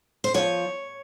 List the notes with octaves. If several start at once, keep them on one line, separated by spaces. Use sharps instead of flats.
C5
F3 C#5